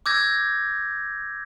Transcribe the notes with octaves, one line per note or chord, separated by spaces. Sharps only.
D6 E6 G6 G#6 A#6